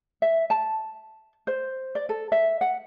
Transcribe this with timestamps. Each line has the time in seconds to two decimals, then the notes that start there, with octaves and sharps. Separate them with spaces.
0.22 E5
0.50 A5
1.47 C5
1.95 D5
2.09 A4
2.32 E5
2.61 F#5